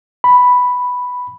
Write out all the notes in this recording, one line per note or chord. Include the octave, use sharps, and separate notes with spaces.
B5